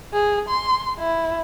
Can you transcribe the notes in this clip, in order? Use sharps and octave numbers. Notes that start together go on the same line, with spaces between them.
G#4
C6
E4